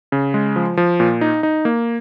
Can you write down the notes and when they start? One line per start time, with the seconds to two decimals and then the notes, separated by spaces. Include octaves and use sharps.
0.12 C#3
0.34 G#3
0.56 F3
0.77 F3
1.00 A#2
1.21 D#4
1.43 D#4
1.65 A#3